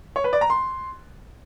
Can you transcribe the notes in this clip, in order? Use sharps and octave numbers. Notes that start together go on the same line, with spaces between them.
C#5
B4
D5
A#5
C6